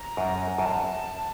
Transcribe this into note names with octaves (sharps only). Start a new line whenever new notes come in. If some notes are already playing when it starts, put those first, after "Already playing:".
Already playing: A#5
F#2
F#2 A5